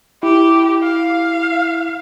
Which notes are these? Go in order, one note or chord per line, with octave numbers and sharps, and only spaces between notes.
E4 G4
F5